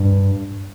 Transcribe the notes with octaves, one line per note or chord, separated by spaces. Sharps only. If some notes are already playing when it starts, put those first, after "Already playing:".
Already playing: G2